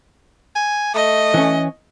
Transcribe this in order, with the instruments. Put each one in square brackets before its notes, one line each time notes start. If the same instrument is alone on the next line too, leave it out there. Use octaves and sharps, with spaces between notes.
[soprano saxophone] G#5
[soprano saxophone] A3 [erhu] D#5
[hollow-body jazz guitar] E3 C#4